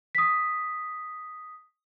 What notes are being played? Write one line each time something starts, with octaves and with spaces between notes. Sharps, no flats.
D#6 B6